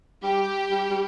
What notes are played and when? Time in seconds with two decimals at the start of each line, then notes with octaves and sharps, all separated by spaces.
0.23 G3 G4
0.71 G3
0.91 G3